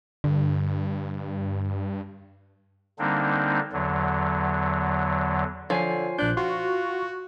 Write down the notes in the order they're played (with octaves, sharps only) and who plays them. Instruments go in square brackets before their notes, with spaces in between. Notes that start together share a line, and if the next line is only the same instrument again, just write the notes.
[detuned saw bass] G2 [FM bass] D3
[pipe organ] D3 G3 A#3 C4 D4 D#4
E2 D3 F#3
[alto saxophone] D3 [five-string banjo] F3 [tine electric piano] C#5 G#5 C7
[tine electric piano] A#1 F#6 G6 [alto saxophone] D4
[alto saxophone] F4 [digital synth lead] F#4 [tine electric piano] C6